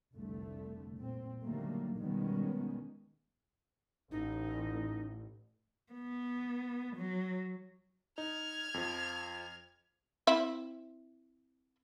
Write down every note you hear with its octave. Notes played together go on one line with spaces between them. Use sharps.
F1 C2 D3 A3
A#2 C4
D3 D#3 F#3 G3 A3 A#3
B2 D#3 G3 G#3 B3 C#4
A1 D#4
B3
F#3
D#4 F6 G#6
F2 F3
C4 E4 E5